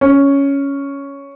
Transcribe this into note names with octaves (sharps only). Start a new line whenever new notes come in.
C#4